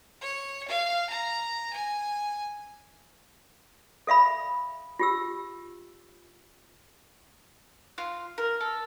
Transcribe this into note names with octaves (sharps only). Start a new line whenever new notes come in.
C#5
F5
A#5
G#5
A4 E5 F5 B5
F4 G4 E6
F4
A#4
A4